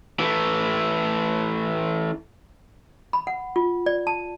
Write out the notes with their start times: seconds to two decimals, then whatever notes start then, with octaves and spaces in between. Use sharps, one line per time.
0.20 E3 A3
3.13 B5
3.27 F#5
3.56 F4
3.86 D5
4.07 A5